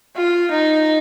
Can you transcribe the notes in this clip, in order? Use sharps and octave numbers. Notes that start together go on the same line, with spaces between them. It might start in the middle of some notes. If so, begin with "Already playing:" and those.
F4
D#4